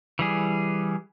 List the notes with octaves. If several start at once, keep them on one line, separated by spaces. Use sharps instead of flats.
E3 G3 G#4